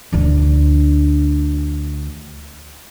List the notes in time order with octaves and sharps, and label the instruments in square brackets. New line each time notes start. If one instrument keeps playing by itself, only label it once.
[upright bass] D2 D3